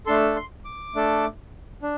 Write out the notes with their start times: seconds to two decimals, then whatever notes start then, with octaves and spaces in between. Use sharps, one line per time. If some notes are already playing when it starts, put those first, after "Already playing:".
0.06 A3 D4 A4 C6
0.36 C6
0.65 D6
0.95 A3 D4 A4
1.82 D4